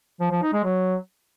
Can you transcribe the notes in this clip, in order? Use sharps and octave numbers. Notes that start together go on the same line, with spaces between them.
F3
F3
D#4
G#3
F#3